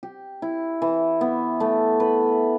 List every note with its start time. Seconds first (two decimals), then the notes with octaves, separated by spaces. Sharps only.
0.03 G4
0.42 E4
0.82 E3
1.21 B3
1.60 A3
2.00 B4